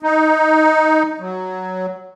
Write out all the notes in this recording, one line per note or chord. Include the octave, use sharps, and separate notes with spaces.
D#4
F#3